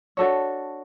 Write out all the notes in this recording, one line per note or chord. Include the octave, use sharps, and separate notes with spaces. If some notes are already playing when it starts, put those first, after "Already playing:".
D4 F#4 A4 C#5